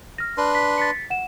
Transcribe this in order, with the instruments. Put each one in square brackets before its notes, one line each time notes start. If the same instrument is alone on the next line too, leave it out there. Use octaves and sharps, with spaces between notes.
[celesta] F6 A#6
[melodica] D4 B4 C6
[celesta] B6
A6 B6 C#7
F#5 E7